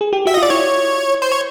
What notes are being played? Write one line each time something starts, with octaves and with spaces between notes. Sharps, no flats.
G#4
G4
F#4 E5
D#5
F4
D5
E4 C#5
C5
C#5